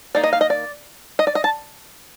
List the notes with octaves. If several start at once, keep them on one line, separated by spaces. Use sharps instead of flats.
D#3 A#3 D#4 D5
D#5
F5
D#5
D5
D#5
D5
D#5
A5